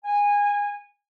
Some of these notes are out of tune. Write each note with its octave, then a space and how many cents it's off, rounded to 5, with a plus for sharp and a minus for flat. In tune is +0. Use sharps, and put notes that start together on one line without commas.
G#5 -20